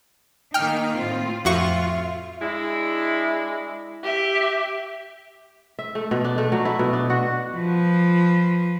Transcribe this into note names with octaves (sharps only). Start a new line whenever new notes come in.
D#3 A#3 D#4 G5 F6
A2 C4 F4
F2 F4 F#4 E5 C#6
G#3 D4 E4
G4 E5
E5
A3
B2
D4
A3
F#3
E4
B2
D4
F#4
F3 B4